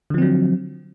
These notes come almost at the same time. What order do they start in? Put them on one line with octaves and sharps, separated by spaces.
D3 F3 C4 F#3